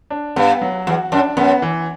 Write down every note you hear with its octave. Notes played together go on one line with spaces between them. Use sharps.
D4
G2 B3
F#3
E2 F#4
F#2 D4
F#2 B3
E3